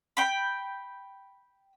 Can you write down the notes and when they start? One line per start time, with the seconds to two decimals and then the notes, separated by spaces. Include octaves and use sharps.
0.17 G5 B5